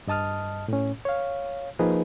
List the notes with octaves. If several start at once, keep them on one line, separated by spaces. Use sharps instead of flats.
G2 D#5 A5 D#6 F6
A2 C#4
C#5 F5
F3 A#3 D#4 G#4 B4